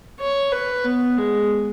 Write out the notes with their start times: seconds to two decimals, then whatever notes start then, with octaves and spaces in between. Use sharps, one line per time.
0.20 C#5
0.52 B4
0.85 B3
1.17 G#3